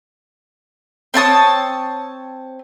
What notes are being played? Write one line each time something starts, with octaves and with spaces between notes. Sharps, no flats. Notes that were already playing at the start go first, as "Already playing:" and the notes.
C4 C#5 A5 D#6